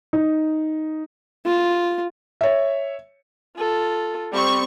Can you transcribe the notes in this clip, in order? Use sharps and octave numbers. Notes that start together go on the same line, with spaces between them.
D#4
F4
C#5 E5
F4 A4
G3 C4 C#6